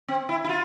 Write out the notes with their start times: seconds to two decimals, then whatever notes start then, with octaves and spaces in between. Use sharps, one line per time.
0.08 C4
0.29 E4
0.44 E4
0.49 F4